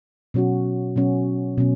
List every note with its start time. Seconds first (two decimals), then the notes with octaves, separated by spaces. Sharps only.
0.34 B2 F#3 C#4 F#4
0.96 B2 F#3 C#4 F#4
1.58 B2 F#3 C#4